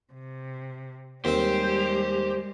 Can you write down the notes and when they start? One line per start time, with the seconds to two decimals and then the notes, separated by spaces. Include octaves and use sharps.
0.13 C3
1.25 D#2 G3 G#3 C4 G4 C5